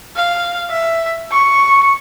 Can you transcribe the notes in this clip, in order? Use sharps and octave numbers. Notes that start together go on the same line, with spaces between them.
F5
E5
C#6